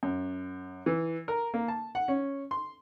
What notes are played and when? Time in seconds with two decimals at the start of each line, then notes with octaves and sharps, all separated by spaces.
0.03 F#2
0.86 E3
1.28 A#4
1.54 A#3
1.68 A5
1.95 F#5
2.08 C#4
2.51 C6